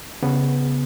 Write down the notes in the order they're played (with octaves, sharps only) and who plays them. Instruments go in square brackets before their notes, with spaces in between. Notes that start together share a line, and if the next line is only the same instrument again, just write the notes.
[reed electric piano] C#3 B3